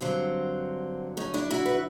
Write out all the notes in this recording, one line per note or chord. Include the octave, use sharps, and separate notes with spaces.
G2 D3 F#3 C4
C#4 D#4
D4 E4
E4 F#4
B4